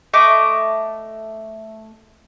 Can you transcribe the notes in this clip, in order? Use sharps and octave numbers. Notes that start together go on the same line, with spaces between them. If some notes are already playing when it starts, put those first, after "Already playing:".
A3 D#5 C#6 D6